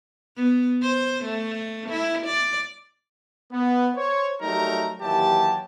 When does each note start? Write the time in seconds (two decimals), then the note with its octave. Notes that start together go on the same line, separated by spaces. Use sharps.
0.36 B3
0.83 C5
1.24 A3
1.89 E4
2.26 D5
3.52 B3
3.96 C5 C#5
4.41 F#3 G3 A3 D#4 A#4 A#5
5.01 D#2 E3 F#3 G4 A5